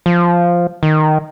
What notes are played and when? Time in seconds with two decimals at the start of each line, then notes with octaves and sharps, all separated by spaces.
0.06 F3
0.83 D#3